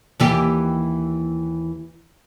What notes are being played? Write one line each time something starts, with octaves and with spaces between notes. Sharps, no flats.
D#2 E3 G4